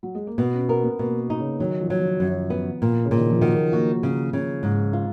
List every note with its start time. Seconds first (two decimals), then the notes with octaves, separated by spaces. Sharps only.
0.03 F#3
0.15 G#3
0.27 A#3
0.38 B2 B3
0.54 C#4
0.68 B3 A#4
0.84 B3
0.99 B2 A#3
1.30 D#4
1.39 C#3
1.59 D#3 F#3
1.81 F3
1.90 F#3
2.00 F3
2.20 F#2
2.50 B3
2.82 A#2
3.05 C#3
3.11 A#2
3.17 D#3
3.30 F3
3.41 D#3 F#3
3.73 A#3 F#4
4.03 C#3
4.33 C#3
4.63 G#2
4.93 F4